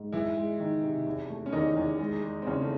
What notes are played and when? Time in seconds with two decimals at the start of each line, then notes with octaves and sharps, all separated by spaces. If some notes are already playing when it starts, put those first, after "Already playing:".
Already playing: G#2
0.12 E3 G#3 E4
0.37 G#3
0.60 D#3
0.83 C3
1.06 E2
1.30 A3
1.46 C#4
1.53 E2 D#3 D#4
1.76 E2
1.99 G#3
2.23 G#3
2.42 C4
2.46 E2 C#3 C#4
2.62 A3